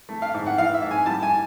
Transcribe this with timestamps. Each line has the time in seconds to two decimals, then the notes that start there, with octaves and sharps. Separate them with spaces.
0.09 A3
0.22 F5
0.34 G#2
0.46 F#5
0.58 E3 F5
0.74 E5
0.82 G#2
0.91 G#5
1.06 G3 A5
1.23 G#5